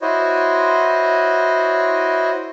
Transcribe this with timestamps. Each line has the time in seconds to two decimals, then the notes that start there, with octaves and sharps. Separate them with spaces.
0.02 E4 F#4 C5 C#5 D#5